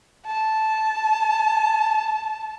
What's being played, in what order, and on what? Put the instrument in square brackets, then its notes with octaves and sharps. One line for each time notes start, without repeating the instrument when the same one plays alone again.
[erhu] A5